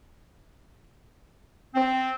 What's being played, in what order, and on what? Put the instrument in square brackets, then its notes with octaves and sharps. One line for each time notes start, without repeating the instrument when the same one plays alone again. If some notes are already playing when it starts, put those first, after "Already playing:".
[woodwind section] C4